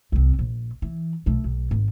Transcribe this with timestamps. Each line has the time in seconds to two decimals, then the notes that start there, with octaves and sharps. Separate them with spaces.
0.12 C2 C4
0.39 A#1
0.82 E3
1.26 B1 A3
1.44 B1
1.71 G#1